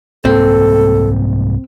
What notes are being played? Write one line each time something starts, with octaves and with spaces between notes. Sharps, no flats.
C2 G#2 A#3 C4 A4